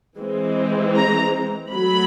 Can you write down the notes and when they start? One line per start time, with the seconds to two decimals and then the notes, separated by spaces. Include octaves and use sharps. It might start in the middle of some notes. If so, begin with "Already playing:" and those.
0.17 E3 G#3 C4
0.96 A#5
1.74 F#3 A3 B5